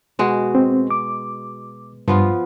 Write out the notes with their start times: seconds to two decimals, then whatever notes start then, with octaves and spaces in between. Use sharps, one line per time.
0.19 B2 G#3 F#4
0.55 C4
0.91 D6
2.08 G2 F3 B3 F4